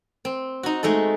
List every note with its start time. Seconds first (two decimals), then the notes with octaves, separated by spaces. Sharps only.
0.25 C4
0.63 D#4 F#4
0.83 G#3 A3 D#4 A4